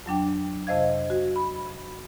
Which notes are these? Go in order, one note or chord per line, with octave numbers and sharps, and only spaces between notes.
F2 F#3 D4 G5
F2 C3 C5 D#5 F5 G#6
F#4
B5